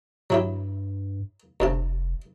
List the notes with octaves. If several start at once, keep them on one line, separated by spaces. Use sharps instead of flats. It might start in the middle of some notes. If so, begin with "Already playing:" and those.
G2 F#3 E4 G4
F1 D2 C3 A5